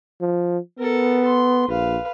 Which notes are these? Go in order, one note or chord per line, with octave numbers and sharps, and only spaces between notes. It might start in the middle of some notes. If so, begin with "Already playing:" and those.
F3
B3 A4 A#4
C6
A#1 B4 F5